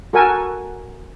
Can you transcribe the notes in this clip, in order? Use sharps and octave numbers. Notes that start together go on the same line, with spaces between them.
F#4 A4 A#4 F#5 G#5